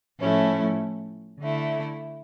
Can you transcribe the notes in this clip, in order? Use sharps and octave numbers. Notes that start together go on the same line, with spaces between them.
A2 F3 A3 C#4 E4
D3 A3 E4